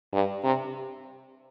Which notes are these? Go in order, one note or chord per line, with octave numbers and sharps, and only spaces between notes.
G2
C3